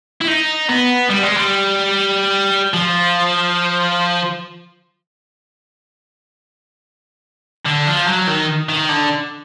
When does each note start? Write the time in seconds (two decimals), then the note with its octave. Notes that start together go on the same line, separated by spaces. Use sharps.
0.21 E4
0.28 D#4
0.69 B3
1.10 G3
1.23 G#3
1.37 G3
2.74 F3
7.66 D3
7.87 F3
8.07 F#3
8.27 D#3
8.69 D#3
8.89 D3